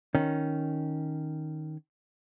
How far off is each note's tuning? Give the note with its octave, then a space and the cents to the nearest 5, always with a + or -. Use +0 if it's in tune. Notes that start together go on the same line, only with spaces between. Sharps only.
D#3 +0 C#4 +0